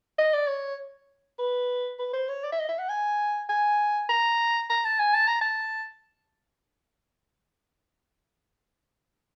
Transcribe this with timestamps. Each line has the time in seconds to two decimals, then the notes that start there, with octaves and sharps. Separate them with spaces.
0.19 D#5
0.34 D5
0.48 C#5
1.39 B4
1.99 B4
2.13 C5
2.29 C#5
2.44 D5
2.52 E5
2.59 D#5
2.69 E5
2.79 F#5
2.89 G#5
3.49 G#5
4.09 A#5
4.70 A#5
4.84 A5
4.99 G#5
5.14 A5
5.28 A#5
5.41 A5